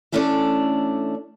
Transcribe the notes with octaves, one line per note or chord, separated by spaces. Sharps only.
E3 A3 C#4 D4 A4 D5